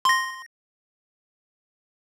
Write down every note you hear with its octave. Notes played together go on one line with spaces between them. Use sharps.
C6 A#6